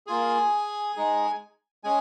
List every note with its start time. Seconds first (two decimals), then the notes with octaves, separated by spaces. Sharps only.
0.07 A#3 F4 G#4 G#5
0.96 G#3 D#4 G#4
1.84 G#3 C#4 G#4 G#5